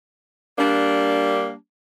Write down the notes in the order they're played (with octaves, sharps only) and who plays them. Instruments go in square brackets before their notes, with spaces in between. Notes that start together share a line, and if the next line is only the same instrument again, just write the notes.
[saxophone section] G3 A#3 D4